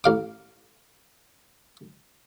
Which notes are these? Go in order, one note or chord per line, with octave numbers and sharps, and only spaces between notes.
A1 F5 D6